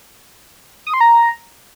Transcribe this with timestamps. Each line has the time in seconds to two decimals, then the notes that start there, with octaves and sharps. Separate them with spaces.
0.87 D#6
0.94 C6
1.01 A#5